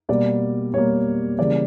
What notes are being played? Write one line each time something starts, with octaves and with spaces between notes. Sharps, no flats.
B2 G3 A#3 D5
B2 G3 A#3 C#5
C#3 E3 G3 A#3 D5